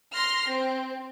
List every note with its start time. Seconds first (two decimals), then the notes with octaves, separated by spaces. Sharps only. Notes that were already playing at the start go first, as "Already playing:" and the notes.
0.13 C6 F6 A#6 C7
0.47 C4